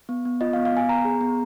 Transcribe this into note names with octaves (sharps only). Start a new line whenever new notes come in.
B3
B3
F4 D#5
B3 F5
F5
B3 G#5
B3 A#5
G#4
B3